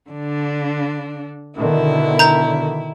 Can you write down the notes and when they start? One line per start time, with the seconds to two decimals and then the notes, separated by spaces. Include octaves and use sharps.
0.10 D3 D4
1.57 B2 D3 D#3 E4
2.19 A#5 G6